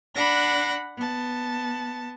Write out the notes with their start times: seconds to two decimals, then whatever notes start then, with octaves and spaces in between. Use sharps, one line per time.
0.15 D4 F#5 B5 A#6
0.98 B3 A5